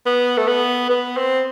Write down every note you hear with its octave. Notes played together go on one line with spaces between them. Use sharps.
B3
A3
B3
B3
C4